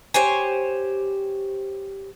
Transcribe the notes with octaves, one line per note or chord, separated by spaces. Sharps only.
G4 C5 C#5 G#5